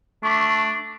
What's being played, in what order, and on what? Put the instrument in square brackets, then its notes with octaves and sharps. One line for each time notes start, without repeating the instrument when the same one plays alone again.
[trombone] A3 [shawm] D4 [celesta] C#6 D6 B6